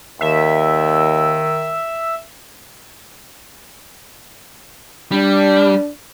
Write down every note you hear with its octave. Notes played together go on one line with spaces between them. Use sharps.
D#2 D#3 E5
G3 D4